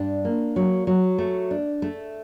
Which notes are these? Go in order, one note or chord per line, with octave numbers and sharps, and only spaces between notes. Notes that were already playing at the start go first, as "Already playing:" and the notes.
Already playing: G2 D4
A#3
F#3
F#3
A3
D4
A3